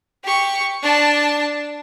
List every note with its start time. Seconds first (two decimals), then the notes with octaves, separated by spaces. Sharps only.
0.24 G4 C#6
0.83 D4 A5